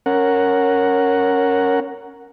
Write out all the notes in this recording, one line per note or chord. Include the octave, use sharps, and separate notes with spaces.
C#4 A#4 F#5